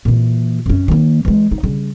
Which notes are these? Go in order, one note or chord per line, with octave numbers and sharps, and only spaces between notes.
A#2 E3
F#2 C#4
D#3 A#3
E3 G#3
D#4
C#3 G3